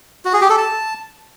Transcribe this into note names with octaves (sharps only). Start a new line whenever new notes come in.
F#4
G#4
G4
A4
A5